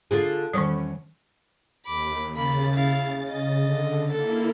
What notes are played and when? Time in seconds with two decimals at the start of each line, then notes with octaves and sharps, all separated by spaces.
0.11 D3 F4 G#4
0.53 E2 D#3 G3 C#4
1.87 D#2 B5 D6
2.35 C#3 A#3 B5 A6
2.75 E4 F5
3.28 D#5
3.61 D3
4.11 A#3 E4 A4